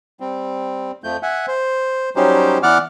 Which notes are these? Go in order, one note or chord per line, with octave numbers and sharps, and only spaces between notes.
G3 C4
F2 F3 A3 G6
E5 F#5 G#5
C5
F#3 G3 C#4 D#4 G4 C5
E3 B3 D5 F#5 D6 F6